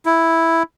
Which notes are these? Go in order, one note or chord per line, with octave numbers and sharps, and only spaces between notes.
E4